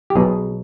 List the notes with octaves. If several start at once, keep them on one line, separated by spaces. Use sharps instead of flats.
G4
B1 B2 G#4